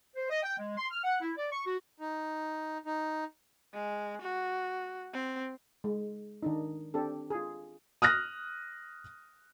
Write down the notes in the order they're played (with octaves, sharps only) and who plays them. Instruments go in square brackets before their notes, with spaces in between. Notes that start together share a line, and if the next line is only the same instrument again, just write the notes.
[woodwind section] C5
D#5
G5
G#3
C6
F6
F#5
E4
D5
C#6
F#4
[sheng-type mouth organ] D#4
D#4
[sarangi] G#3
F#4
C4
[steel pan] G#3
D#3 D4 D#4
C4 D4 G4 A4
F4 G#4
[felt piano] D#6 F6 F#6 A#6